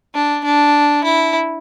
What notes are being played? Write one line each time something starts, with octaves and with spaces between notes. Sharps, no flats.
D4
D4
E4